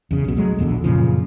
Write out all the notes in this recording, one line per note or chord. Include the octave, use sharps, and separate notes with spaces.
E2 C#3
B1 B2
F#3 G#3 A3
A#1 E2 B2 D3
F#2 A#2 C#3 F3